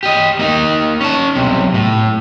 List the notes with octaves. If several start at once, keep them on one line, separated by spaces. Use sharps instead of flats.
G4 D#5
A#3 D#4
C#4 A5
B1 C3
A2